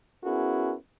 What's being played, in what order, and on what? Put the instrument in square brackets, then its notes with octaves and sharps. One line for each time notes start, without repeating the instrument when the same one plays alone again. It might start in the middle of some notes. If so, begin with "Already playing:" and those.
[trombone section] B3 C#4 E4 F#4 G#4 A#4